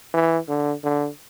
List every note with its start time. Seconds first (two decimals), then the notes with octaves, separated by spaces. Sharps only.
0.14 E3
0.49 D3
0.83 D3